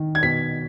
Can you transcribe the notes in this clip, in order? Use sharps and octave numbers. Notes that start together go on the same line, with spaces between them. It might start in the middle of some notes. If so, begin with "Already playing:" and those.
Already playing: D#3
G#6
B2 B6